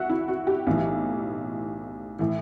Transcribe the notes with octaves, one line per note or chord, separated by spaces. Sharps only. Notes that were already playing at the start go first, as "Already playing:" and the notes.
Already playing: C2 F#4 E5 F#5
E4
F#4
G4
B1 A2 E3
A2 E3